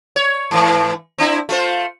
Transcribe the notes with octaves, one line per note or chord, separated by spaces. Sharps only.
C#5
G#2 E3
C4 D4 E4
A3 F4 C5